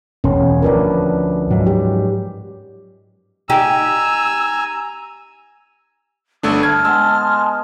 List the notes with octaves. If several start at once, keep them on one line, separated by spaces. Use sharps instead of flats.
E1 C#4
D2 F3 A#4 B4 D5
G#2 F3 F#3
G4
D#4 G4 G#5 A#5 E6
G1 A3 D4 D#6 E6
A5 F6 G#6
G#3 B3 E6